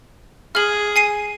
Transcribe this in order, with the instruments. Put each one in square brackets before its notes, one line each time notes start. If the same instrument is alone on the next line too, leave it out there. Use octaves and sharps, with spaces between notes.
[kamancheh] G#4 [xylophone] F6 F#7
[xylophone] G#5 C7 D#7